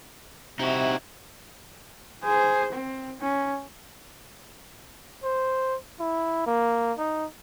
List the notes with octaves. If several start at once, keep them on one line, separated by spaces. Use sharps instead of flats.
C3 D#4 E4 F#4
G#4 C5
C4
C#4
C5
E4
A#3
D#4